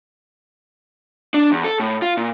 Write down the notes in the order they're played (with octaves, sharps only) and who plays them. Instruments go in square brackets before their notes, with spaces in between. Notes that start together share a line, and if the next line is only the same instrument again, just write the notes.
[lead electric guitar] D4
E2
A4
A2
F4
A#2